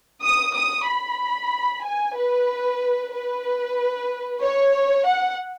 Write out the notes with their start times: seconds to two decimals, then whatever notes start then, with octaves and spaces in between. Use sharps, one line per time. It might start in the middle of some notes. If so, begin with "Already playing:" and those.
0.23 D#6
0.55 D#6
0.87 B5
1.83 G#5
2.16 B4
3.13 B4
4.41 C#5
5.06 F#5